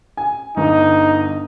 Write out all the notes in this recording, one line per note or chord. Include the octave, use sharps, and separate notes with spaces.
G#5
G1 D#4